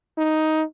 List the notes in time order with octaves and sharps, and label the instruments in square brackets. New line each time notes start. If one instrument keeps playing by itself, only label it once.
[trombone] D#4